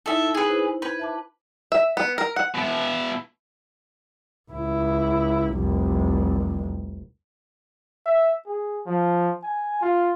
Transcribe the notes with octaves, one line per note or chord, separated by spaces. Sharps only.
D#4 E4 A4 E5
G#4 B4
E4 C5
B4 G6 G#6
E5 A5 D6
E5
B3
A#4
F#5
B2 E4
C#2 E4
F1 C2
E5
G#4
F3
G#5
F4